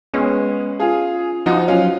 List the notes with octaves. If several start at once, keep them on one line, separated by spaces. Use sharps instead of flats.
G#3 B3 C#4
F4 G#4
F3 D#4 F#4
F#3 C#4 F4